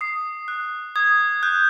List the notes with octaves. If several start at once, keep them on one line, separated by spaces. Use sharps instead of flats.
D#6 C7
F#6
D#6 G#6
F#6 G6